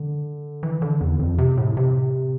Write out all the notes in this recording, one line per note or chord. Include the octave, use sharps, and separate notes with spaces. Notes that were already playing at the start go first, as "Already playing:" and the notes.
Already playing: D3
E3
D3
E2
F2
C3
A2
C3